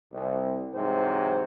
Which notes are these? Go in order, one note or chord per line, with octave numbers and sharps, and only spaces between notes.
C2
G#2 C3 E3 F#3 C4 C5